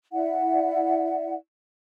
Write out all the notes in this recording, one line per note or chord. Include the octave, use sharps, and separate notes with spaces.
E4 D5 E5 F#5